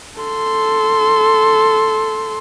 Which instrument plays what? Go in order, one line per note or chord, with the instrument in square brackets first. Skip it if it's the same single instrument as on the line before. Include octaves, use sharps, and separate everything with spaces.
[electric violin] A4 C6